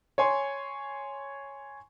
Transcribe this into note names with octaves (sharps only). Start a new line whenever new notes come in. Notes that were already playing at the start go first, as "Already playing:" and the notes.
C#5 G#5 C6